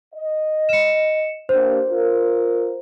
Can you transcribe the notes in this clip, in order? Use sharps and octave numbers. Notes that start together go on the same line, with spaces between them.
D#5
C#7 E7
A#3 D4 G4 C5
F4 A#4